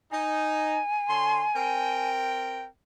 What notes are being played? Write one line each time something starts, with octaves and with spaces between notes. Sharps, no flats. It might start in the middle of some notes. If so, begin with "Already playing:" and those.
D#4 G#5
D3 C#5 C6
C4 A#4 G5